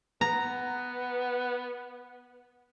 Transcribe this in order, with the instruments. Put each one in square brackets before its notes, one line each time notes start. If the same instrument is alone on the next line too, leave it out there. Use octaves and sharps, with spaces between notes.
[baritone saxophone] B3 [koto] A#5